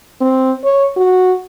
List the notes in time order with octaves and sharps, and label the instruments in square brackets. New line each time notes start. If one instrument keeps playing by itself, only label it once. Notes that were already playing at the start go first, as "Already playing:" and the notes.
[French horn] C4
C#5
F#4